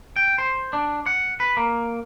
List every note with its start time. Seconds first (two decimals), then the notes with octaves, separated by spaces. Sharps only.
0.16 G5
0.38 C5
0.73 D4
1.06 F#5
1.40 B4
1.57 A#3